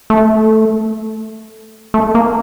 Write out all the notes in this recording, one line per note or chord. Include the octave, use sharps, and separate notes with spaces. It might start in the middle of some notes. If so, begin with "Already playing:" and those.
A3
A3
A#3